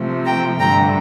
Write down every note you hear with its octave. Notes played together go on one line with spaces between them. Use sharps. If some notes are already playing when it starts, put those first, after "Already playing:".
Already playing: C3 F3 A3
G5 A#5
G2 D3 A3 G5 A#5